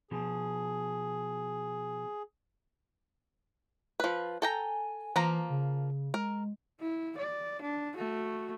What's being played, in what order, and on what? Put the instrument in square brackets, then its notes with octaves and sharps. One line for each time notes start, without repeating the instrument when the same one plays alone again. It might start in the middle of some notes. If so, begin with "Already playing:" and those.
[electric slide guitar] B2 F3 [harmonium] G#4
[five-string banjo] F3 B4
[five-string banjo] A4 G5 A#5 [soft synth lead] G#5
[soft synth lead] E3 [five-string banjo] F3 A#3 A#5
[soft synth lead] C#3
[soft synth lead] G#3 [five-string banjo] A#4
[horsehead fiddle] E4
D5
D4
A3 F#4